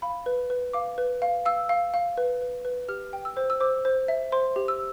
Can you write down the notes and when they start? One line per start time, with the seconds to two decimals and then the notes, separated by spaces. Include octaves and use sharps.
0.02 F5 B5
0.26 B4
0.50 B4
0.73 F5 D6
0.98 B4
1.22 F5
1.46 F5 E6
1.69 F5
1.94 F5
2.17 B4
2.42 B4
2.65 B4
2.88 G4 F6
3.13 G5
3.25 E6
3.37 C5
3.50 E6
3.60 C5 D6
3.85 C5
4.08 E5
4.32 C5 C6
4.56 G4
4.68 E6